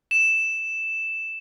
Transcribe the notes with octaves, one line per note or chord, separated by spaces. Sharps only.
E7